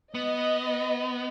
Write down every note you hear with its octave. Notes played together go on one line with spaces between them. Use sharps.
B3 D#5